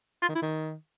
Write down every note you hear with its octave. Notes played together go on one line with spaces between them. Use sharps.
F4
D#3
E4
D#3